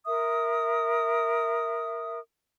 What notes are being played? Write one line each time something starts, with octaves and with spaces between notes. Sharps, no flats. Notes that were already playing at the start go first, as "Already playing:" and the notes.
A#4 E5 D#6